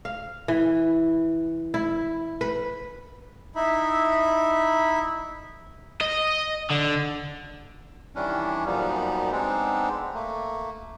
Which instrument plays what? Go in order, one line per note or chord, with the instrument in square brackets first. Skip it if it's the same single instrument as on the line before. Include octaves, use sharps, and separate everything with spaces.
[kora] F5
E3
E4
B4
[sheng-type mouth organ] D#4 E4 E5 B5
[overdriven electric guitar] D#5
D3
[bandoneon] D#3 E3 G3 C#4 D4
F#2 A#2 F3 G3 B3 D#4
G#3 B3 C4 D4 D#4
A3 A#3